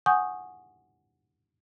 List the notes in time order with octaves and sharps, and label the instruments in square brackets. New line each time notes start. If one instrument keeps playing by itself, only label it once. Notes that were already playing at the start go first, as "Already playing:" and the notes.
[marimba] F#5 G#5 C#6 D#6 G6